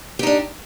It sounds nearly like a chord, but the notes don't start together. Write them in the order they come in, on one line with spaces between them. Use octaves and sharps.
G4 D#4 D4